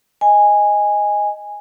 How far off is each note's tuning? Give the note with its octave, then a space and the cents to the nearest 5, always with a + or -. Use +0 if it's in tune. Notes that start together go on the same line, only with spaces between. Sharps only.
D#5 +0 G#5 -10